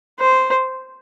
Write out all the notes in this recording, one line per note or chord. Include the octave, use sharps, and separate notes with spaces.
C5